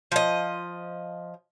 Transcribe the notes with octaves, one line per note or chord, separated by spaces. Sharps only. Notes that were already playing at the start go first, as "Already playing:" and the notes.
F3 D#5